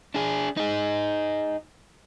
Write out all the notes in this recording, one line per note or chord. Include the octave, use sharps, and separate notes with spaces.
D4 G#4
D#4 G#4